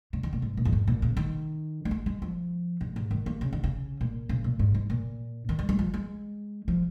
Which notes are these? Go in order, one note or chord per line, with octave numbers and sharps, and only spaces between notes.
C#3
D#3
A#2
G#2
A#2
F2
G#2
A#2
C#3
D#3
A#3
G#3
G#3
F3
G#2
G#2
D#3
A#3
C#3
D#3
C#3
A#2
C#3
A#2
G#2
G#2
A#2
D#3
G#3
G#3
F3
G#3
F3